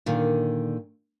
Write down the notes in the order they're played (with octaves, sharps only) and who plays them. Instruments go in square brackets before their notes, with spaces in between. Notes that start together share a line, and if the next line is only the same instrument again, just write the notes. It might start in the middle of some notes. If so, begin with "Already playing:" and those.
[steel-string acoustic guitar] A#2 D3 D#3